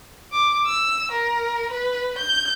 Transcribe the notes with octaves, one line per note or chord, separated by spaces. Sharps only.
D6
E6
A#4
B4
G6